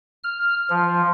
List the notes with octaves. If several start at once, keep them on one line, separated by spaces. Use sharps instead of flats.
F6
F3